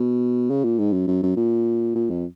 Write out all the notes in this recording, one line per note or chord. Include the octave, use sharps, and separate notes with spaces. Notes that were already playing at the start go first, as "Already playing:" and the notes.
Already playing: B2
C#3
A#2
G#2
F#2
F#2
F#2
A#2
A#2
F2